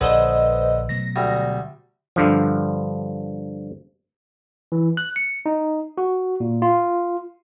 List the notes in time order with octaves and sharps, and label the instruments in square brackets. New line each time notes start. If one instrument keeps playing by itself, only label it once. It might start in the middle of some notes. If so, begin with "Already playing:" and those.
[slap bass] A#1 [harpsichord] D3 G#4 [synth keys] B4 C5 D#5
[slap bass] B2 F#3 A3 [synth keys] A#6
[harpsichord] D2 G3
[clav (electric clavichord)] G2 D3 F3
[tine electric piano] E3
F#6
C#7
D#4
F#4
A#2
F4